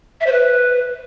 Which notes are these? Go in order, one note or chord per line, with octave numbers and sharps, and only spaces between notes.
E5
C5
B4